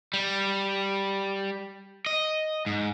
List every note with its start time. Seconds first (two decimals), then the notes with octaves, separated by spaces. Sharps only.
0.14 G3
2.06 D#5
2.66 G#2